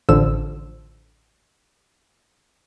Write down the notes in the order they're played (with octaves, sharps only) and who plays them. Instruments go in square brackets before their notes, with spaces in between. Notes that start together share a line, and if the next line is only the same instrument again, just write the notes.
[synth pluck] A1 D3 F3 E6